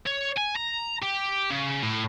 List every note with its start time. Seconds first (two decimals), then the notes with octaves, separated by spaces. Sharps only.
0.07 C#5
0.38 G#5
0.56 A#5
1.03 G4
1.51 C#3
1.82 A2